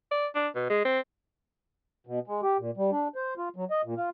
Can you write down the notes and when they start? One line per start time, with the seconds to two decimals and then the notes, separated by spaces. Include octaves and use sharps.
0.12 D5
0.35 D4
0.55 B2
0.70 G#3
0.85 C4
2.07 B2
2.27 G#3
2.42 G4
2.59 A#2
2.77 G3
2.92 D4
3.15 C5
3.37 F4
3.56 F#3
3.70 D#5
3.84 A#2
3.97 F4